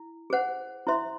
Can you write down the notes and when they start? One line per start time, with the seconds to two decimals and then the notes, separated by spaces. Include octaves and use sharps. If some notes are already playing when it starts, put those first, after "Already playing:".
Already playing: E4
0.30 G#4 C5 F#5
0.87 E4 C5 E5 C6